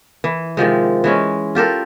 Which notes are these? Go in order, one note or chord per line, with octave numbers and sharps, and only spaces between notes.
E3
C3 D#3 F3 G#3
E3 G#3 C#4
F4 G4 A4 A#4